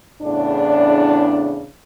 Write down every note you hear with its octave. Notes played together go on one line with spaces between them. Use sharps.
E2 A2 C#3 D4